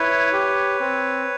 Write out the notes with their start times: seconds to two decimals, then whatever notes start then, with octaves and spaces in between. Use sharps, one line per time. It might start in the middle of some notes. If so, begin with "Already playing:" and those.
Already playing: E4 B4 C#5
0.33 G4
0.80 C4